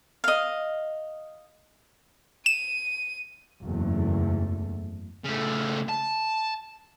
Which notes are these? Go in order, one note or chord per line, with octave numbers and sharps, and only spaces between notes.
D#5 F5
D#7 E7
F#1 E2 G#2 A3
C#3 A3
A5